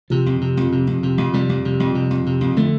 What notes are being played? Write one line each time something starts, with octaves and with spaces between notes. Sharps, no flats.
C3 F3
F2
C3
F2
C3
F2
C3
F2
C3 G3
F2
C3
F2
C3
F2
C3
F2
D3 A3